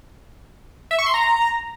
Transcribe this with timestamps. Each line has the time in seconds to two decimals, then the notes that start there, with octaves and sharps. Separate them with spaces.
0.91 E5
0.98 C#6
1.06 C6
1.14 A#5